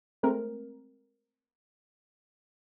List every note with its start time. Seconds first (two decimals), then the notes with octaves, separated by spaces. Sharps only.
0.23 G#3 A3 C4 A#4